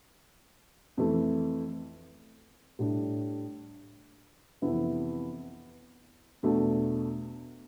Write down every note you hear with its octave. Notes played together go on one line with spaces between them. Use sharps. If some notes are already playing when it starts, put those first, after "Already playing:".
F2 E3 A3
A2 G3 D4
F2 C3 E3 B3 E4
E2 B2 A3 D4